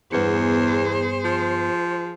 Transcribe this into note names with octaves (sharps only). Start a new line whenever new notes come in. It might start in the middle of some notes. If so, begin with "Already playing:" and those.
E2 G2 B3 G#4 C5 C#7
F3